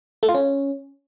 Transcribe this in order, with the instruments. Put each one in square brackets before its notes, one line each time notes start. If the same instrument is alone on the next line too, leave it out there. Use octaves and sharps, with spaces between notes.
[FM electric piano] A3
F4
C#4